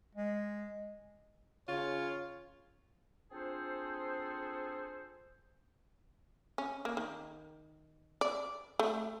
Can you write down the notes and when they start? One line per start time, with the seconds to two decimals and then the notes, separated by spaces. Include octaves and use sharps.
0.15 G#3
1.68 C#3 F4 C#5
3.31 C4 D4 F4 G#4 A4 C5
6.58 C#4
6.85 A#3
6.97 D#3
8.21 D5
8.79 A3